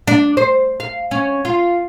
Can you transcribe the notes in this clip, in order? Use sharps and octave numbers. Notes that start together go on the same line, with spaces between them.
D4
C5
F5
C#4
F4